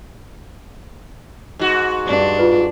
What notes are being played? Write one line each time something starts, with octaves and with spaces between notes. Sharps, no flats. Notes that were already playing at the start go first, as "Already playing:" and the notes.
G#2 F#4
G2 D4
F4 B4